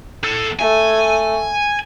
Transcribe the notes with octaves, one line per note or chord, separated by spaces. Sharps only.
A2 A4
A3 G#5